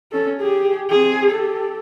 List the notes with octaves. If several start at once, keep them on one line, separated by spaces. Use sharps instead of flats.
C#4 A4
G4 G#4
C4 G#4
G4 A4